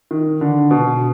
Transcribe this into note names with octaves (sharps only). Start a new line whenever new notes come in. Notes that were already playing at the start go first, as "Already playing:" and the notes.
D#3
D3
B2